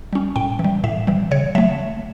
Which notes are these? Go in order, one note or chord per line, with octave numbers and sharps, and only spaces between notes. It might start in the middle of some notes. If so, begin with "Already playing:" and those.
G3 C#4
A2 G5
E3
G3
A2 E5
E3 G3
C#3 C#5
F#3 A3 E5